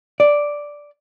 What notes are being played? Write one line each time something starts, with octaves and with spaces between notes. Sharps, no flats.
D5